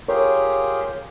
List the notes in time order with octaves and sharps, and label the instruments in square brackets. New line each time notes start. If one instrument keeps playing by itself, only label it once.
[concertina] F4 G4 G#4 [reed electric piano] A#4 C#5